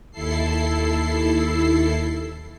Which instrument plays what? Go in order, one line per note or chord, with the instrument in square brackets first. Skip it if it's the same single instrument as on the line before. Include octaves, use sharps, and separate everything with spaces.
[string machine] D#2 E4 A4 C7